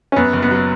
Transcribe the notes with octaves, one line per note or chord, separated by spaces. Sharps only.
C#4
F#2 B3
F#1
B3
F#3